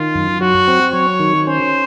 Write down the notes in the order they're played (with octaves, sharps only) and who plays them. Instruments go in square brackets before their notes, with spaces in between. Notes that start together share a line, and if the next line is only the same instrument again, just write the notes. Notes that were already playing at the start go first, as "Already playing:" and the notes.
Already playing: [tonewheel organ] D#3 [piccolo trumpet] F4
[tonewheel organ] F#2
[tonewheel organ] F#3 [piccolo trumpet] F#4
[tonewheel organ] C4
[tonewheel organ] F#3 [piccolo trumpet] C#5
[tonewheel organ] D#3
[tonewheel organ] C#4 [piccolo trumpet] C5